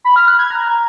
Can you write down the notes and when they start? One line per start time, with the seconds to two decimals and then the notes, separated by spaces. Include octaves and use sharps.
0.04 B5
0.16 F6
0.27 F#6
0.39 G#6
0.50 A#5